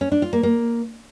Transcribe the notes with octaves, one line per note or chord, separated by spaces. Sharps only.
C#4
D4
F4
A#3
A#3